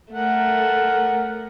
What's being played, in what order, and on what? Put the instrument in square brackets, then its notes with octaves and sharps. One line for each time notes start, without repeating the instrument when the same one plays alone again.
[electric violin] A3 [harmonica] A#4 F#5